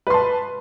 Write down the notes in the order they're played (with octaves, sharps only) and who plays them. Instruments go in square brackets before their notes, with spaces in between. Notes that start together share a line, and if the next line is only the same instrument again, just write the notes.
[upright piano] B4
C6
A5